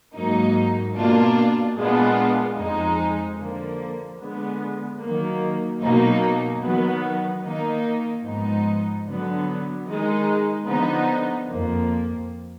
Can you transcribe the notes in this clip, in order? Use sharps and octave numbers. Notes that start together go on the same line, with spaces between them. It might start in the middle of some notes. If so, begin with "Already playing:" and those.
G#2 F#3 A#3 D#4
B2 A#3 D4 F4
A#2 G#3 B3 D4 F4
F2 F3 G#3 D#4
D3 F3 A#3
D3 G#3 B3
D#3 F#3 A#3
B2 F#3 A#3 D#4
D#3 F#3 B3
D#3 A#3 D#4
G#2 F3 B3 D#4
D3 F#3 B3
D#3 G#3 D#4
D3 F3 B3 D#4
F2 F3 A#3